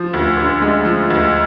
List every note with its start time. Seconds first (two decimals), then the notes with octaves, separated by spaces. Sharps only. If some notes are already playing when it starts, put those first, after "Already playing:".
Already playing: F3
0.13 D2
0.37 D3
0.62 G#3
0.85 F3
1.10 D2